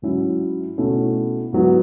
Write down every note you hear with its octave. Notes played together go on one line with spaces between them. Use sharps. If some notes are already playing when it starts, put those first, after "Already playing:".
G#2 F#3 C#4 E4
B2 A3 C#4 E4
G#2 F#3 B3 E4